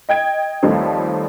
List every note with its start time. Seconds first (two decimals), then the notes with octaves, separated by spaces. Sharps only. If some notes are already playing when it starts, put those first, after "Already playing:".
0.09 D#5 G5 G#6 D7
0.62 D#2 F3 G3 A3 C4 D#4